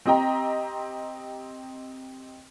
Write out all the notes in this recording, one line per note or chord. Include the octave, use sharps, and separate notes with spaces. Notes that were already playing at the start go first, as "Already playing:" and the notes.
C4 G4 D#5 G5 A#5